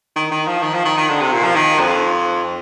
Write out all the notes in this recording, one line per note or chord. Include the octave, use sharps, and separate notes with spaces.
D#3
D#3
F3
D#3
F3
D#3
D#3
D3
C3
A#2
F3
D#3
F2